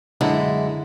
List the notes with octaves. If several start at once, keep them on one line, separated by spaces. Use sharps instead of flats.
F#2 D3 G#3 E4